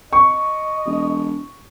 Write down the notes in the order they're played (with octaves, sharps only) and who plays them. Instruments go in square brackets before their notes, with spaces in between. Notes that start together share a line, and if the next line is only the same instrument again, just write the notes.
[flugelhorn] D#5 [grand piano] C#6
[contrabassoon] E1